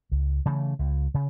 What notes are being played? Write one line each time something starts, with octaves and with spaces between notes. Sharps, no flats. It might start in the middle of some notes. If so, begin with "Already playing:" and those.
C#2
C#3 E3 A3
C#2
C#3